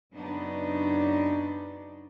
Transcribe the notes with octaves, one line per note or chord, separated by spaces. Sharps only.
F#2 C#3 F#3 B3 D4 D#4